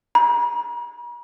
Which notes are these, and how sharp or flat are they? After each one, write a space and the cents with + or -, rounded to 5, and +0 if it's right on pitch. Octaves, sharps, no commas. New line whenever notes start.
A#5 +45